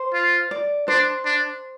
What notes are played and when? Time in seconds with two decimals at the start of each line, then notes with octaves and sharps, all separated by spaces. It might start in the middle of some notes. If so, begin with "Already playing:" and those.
Already playing: C5
0.14 F4
0.51 D5
0.88 D4 C5
1.25 D4